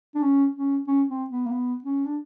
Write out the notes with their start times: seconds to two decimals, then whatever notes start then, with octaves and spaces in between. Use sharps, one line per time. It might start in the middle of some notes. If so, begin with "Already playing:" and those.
0.15 D4
0.23 C#4
0.56 C#4
0.88 C#4
1.09 C4
1.30 B3
1.47 A#3
1.52 B3
1.84 C#4
2.06 D4